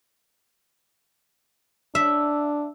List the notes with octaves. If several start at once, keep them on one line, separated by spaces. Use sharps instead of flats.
D4 E5